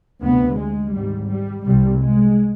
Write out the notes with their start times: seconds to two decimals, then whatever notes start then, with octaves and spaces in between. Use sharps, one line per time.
0.22 D2 C3 B3
0.58 G#3
0.94 G#1 G#2 G3
1.30 G3
1.66 C2 C3 G3
2.02 G#3